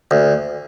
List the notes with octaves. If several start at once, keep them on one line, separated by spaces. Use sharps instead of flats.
D2